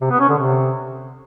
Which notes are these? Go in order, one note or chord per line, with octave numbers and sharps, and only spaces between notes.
C3
B3
C#4
D3
C3